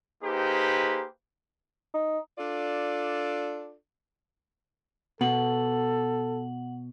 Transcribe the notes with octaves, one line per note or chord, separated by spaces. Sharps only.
A#3 D#4 G4 G#4 B4 C5
D#4
D4 F4 A4 D5
B2 A4 F#5 F#7